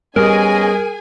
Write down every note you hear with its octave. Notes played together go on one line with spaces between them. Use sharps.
G3 B3 C#4 G#4 A#4 D#5 G#5